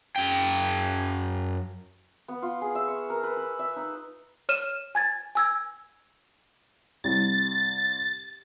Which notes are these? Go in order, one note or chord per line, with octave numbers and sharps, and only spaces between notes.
F#2 G5
B3
F4
G#4
E5
C#6
A#4
B4
B4
E5
D#4
C#5 F6 D#7 E7
G#5 G#6 A6
G#5 E6 G#6
C2 A6